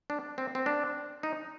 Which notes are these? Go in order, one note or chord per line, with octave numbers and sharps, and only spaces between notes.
D4
C4
C4
D4
D#4